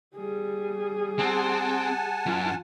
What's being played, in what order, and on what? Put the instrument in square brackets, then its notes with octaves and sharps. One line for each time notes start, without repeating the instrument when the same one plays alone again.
[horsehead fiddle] G3 G#4
[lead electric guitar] C4 [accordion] F#5 G#5 A5
[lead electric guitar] F#2 [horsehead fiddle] F4